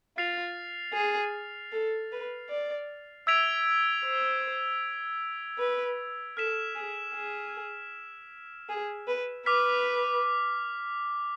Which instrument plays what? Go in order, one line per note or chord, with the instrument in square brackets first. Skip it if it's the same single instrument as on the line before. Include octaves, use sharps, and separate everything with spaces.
[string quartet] F4 [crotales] F6 A6 C7 F7
[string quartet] G#4
A4
B4
D5
[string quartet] E5 [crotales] E6 G#6 B6 D7 F7
[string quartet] C5
B4
[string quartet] A4 [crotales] F6 B6 E7
[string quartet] G#4
G#4
G#4
B4
[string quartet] B4 [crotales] D6 F6 B6